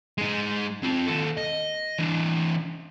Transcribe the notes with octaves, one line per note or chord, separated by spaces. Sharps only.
G#3 D#4
C4 F4
D#2 A4
D#5
E3 D4